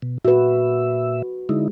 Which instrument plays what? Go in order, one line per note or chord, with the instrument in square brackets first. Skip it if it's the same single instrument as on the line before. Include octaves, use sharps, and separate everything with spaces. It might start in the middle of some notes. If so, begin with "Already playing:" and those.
[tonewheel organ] B2
[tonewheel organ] A#2 E5 [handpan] F#4 B4
[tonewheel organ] D3 D#4 E4 [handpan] G#3